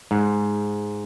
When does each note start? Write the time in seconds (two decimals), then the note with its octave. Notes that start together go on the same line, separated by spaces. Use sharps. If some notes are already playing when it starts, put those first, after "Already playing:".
0.11 G#2